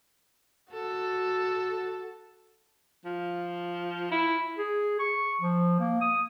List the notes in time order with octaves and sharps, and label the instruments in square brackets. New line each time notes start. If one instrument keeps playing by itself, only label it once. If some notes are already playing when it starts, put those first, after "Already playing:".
[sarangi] F#4 [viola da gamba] A4
[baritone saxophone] F3
E4
[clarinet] G#4
C#6
F3
A#3
D#6